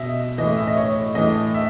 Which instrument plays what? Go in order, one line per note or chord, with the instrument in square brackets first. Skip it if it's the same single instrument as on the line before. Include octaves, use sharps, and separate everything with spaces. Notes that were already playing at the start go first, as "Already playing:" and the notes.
Already playing: [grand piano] B2 D#5 E5
E3 D#5
A2
E5
D#5
C#5
A2 E3 D#5
E5